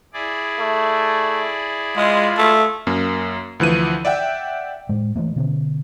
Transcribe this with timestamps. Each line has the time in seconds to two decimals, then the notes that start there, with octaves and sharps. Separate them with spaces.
0.13 E4 G#4 D5
0.59 A3
1.97 G#3 F4
2.38 A3
2.87 F#2 A#3
3.60 D2 E3 F3 D#7
4.05 D5 E5 F#5 G5
4.89 A2 G#3
5.16 E3 F3 A3 A#3
5.36 B2 D3 B3 C#4